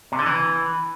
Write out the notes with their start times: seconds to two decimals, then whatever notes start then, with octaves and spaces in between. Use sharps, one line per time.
0.12 C3
0.19 D3
0.26 E3